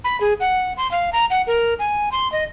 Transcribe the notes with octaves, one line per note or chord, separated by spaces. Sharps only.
B5
G#4
F#5
C6
F5
A#5
F#5
A#4
G#5
C6
D#5